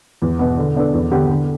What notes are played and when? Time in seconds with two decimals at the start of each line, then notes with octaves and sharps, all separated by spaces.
0.22 E2
0.39 B2 B3
0.57 D3
0.75 B3 D4 A4
0.94 E2
1.11 D3 B3 G4 B4
1.29 D3